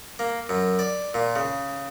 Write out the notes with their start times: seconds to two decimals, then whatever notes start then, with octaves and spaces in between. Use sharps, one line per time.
0.19 A#3
0.49 F#2
0.79 D5
1.14 A#2
1.36 C#3